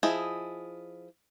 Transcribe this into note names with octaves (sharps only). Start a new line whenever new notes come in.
F3 E4 G#4 D#5